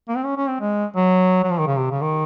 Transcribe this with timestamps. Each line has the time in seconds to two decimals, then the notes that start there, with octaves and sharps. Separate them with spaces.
0.09 A#3
0.17 C4
0.25 C#4
0.37 C#4
0.48 C4
0.61 G#3
0.96 F#3
1.43 F#3
1.51 F3
1.59 D#3
1.67 C#3
1.78 C3
1.91 C#3
2.02 D#3